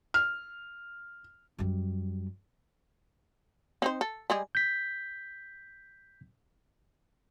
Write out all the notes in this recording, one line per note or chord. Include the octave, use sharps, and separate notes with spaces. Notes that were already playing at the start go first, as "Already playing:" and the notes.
F6
F#2 G3
C4 D#4 C5
A4
G3 G#3 G#4
G6 B6